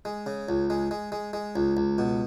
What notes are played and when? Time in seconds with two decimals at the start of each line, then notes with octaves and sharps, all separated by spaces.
0.05 G#3
0.26 C#3
0.49 C#2
0.70 G#3
0.91 G#3
1.12 G#3
1.33 G#3
1.56 C#2
1.77 C#2
1.98 B2